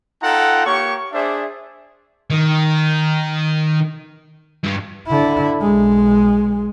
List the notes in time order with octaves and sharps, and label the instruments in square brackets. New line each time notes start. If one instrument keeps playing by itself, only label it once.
[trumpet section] D#4 F4 A4 F#5 G5 A#5
A#3 G4 A#4 C#5 C#6
D4 G#4 C5 D5 E5
[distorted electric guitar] D#3
G2
[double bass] D3 E4
B1 G#3